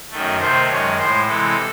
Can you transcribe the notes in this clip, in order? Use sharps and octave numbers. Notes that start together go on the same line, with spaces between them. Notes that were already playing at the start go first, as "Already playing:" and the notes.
F#2 D#3 A3
C3 D#3 A3 C5
F#2 D#3 G#3 C#5
A2 G#3 C5
C3 E3 G#3 A4